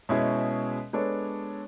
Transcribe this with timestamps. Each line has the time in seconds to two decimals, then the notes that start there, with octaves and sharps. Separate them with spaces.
0.09 B2 G#3 C#4 E4 G#4
0.93 G#3 B3 D4 A4 C#5